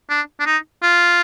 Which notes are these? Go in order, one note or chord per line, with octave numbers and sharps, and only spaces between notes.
D4
D4
D#4
F4